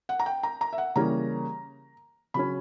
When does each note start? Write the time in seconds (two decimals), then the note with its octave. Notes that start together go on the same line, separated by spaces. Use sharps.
0.09 F#5
0.20 A#5
0.26 G5
0.43 A#5
0.61 A#5
0.73 E5
0.78 F#5
0.96 C#3 E3 G3 A#3 C#4 A#5
2.34 C#3 F#3 C#4 B5